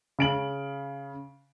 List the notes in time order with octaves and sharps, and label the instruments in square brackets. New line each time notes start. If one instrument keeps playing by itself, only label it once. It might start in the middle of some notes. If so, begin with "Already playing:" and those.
[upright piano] C#3 D7 F#7